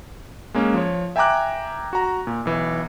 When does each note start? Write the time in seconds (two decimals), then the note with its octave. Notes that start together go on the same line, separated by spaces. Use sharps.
0.54 G#3 A#3 C#4
0.74 F3 C#5
1.16 E5 G5 G#5 A#5 D6 F#6
1.93 F#4 A#5
2.27 A#2
2.45 B1 E3